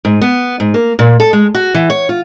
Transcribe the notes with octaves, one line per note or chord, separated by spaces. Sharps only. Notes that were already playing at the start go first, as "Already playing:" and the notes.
G#2
B3
G#2
A#3
A#2
A4
G#3
F#4
E3
C#5
F4